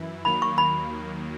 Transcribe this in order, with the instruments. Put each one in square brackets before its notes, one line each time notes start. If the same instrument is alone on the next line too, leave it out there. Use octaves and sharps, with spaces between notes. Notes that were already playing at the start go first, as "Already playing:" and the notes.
Already playing: [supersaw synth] F#2 E3 E4
[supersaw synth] D#2 D#3 F#3 A#3 [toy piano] B5
[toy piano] C#6
B5